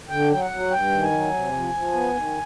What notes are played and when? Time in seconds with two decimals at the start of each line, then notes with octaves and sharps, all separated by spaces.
0.09 D3 G5
0.30 F#3 G5
0.41 F#5
0.51 F#3
0.70 G2 G5
0.92 D#3
1.02 G#5
1.11 F#3
1.33 C3
1.53 F3
1.74 F3
1.93 B3
2.15 D#3